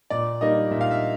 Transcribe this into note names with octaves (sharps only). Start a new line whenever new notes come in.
A#2 D5
G3 A#3 D#4 D#5
A#2 E5
F5
E5